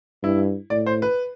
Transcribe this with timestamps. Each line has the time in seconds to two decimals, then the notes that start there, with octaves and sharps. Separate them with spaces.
0.23 G2 E4
0.70 A2 D5
0.86 C5
1.02 B4